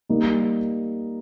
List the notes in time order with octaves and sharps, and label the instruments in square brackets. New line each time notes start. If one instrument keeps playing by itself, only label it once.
[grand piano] G3 A#3 D#4